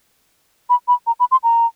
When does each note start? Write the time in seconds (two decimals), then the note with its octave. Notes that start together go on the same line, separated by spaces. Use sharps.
0.70 B5
0.88 B5
1.07 A#5
1.20 B5
1.32 C6
1.44 A#5